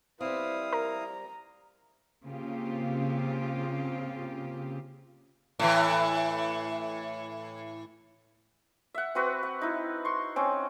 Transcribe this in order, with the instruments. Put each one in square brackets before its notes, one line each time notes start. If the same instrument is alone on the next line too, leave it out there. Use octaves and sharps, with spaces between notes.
[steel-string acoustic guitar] G3 C4 [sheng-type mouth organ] E4 F5 D#6 [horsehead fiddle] B4 C5
[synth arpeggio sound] A#4 [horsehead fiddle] A#5
[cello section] C#3 A#3 C4 F4 G4
[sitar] A2 E3
[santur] E5 F#5
C4 F#4 B4 E6
F#5
D#4 E4
C6 C#6
C4 C#4